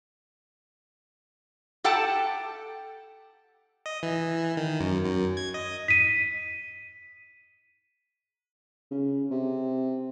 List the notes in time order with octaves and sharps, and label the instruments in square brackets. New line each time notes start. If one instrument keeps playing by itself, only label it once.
[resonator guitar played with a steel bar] G4 A4 F#5 G5 A5
[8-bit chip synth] D#5
E3
D#3
F#2
F#2
G#6
D#5
[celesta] B6 D#7
[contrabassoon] C#3
C3